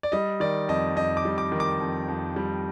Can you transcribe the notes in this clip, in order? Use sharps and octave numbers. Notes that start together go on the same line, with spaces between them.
D5
G3 D#5
D#3 D5
F2 D#5
F2 D#5
D6
G3
D6
D#3
D6
F2
F2
G3